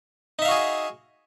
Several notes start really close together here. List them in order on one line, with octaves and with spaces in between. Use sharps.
D#4 E5 F5 F#4 G#4